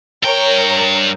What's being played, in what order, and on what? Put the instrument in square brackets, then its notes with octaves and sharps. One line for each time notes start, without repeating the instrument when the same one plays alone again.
[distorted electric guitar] G2 G5 [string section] A#4 C#5 A#5